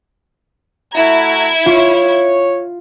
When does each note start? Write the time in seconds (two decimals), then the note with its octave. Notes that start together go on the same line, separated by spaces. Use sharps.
0.94 A3 E4 F#4 A#5 G#6
1.66 F4 C#5